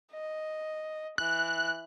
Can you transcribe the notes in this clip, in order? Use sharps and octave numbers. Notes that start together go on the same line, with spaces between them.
D#5
E3 F#6